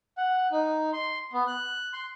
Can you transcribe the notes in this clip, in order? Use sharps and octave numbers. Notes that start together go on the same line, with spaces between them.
F#5
D#4
C6
B3
F#6
C6